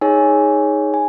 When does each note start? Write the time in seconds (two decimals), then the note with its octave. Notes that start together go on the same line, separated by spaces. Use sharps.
0.01 D#4 G#4 C#5 G#5
0.94 G#5